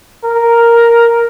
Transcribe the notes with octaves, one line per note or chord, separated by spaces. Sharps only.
A#4